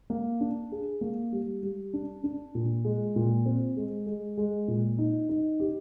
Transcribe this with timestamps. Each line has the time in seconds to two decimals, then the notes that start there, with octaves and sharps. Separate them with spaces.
0.10 A#3
0.41 D4
0.72 G#4
1.01 A#3
1.32 G3
1.63 G3
1.93 D4
2.24 D4
2.55 A#2
2.85 G#3
3.16 A#2
3.46 C4
3.77 G#3
4.06 G#3
4.37 G#3
4.68 A#2
4.98 D#4
5.29 D#4
5.60 G4